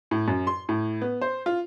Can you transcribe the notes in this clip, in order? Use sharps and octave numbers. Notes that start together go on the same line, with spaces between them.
A2
F#2
C6
A2
B3
C5
F4